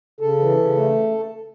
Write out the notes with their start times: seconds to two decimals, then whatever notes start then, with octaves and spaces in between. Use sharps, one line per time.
0.21 C#3 A4
0.39 E3
0.57 C#3
0.75 A3